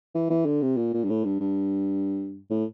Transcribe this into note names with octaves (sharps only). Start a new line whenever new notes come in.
E3
E3
D3
C3
A#2
A#2
G2
A2
G2
G2
A2